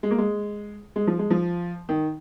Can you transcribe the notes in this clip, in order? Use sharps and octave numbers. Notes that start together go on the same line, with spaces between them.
G#3
A#3
G#3
G#3
F3
G#3
F3
D#3